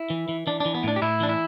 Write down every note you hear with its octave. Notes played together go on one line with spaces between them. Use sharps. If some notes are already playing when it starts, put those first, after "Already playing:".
Already playing: E4
E3
E3
E3 D4
E3 D4
B3
A2 D4
G4
A2 E4
E3 D4
E4